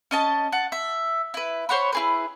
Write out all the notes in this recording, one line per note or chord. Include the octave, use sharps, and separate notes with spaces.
C#4 D#5 A5
F#5 A5
E5
E4 B4
C5 C#5 F#5 B5
E4 G#4 B4